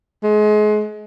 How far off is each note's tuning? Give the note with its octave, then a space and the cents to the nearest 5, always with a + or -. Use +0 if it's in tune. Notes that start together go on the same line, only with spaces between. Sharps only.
G#3 +30